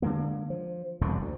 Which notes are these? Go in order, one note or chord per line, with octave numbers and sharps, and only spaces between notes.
D3 F3 G#3 A#3
F3
E1 C2 F#2 D3
D2